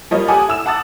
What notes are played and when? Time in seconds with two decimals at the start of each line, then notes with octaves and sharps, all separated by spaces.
0.11 F3 G3 A#3 F4 C#5 D#5
0.28 G4 A4 F#5 G#5 D6 D#6
0.48 E4 E6 E7
0.66 F#5 A5 D6 D#6 A6